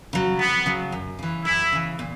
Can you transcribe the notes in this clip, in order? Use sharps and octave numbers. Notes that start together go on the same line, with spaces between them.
C#3 F#3
F2 B3
C#3 F#3
F#2
C#3 E3
F#2 E4
C#3 E3
A#2